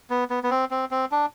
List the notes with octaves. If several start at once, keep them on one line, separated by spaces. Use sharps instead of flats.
B3
B3
B3
C4
C4
C4
D4